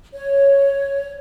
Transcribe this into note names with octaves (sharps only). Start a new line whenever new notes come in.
C#5